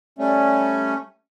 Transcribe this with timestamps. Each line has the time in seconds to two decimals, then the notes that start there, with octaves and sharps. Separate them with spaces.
0.19 G3 A3 C#4